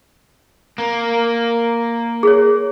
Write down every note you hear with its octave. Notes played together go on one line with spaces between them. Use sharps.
A#3
G#4 C#5